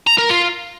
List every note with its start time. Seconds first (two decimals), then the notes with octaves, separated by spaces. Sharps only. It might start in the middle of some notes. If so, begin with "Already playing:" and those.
0.07 A#5
0.19 A#4
0.30 F4